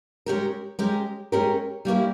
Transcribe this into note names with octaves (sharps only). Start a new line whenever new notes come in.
G#3 C#4 G4 A#4
G#3 C#4 G4 A#4
G#3 C#4 G4 A#4
G3 A#3 C#4 E4 A#4